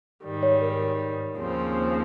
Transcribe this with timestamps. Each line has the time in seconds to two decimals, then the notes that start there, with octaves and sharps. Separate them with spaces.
0.24 G#2 D#3 G3
0.43 C#5
0.61 A#4
1.37 D#2 C#3 F3 C4